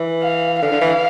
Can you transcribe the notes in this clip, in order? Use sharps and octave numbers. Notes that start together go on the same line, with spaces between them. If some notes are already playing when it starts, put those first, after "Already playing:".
Already playing: E3
F5
D3 F5
D3
E3